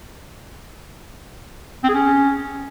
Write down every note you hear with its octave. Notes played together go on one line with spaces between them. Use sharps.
C4
G#4
C#4